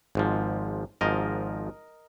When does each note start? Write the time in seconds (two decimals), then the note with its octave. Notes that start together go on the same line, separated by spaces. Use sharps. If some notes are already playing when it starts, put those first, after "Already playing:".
0.15 G#1 G#2 F3
1.01 G#1 G#2 F3 A#4 D#5